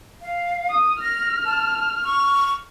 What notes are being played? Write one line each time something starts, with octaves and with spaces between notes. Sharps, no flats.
F5
D#6
F6 A#6
A5
C#6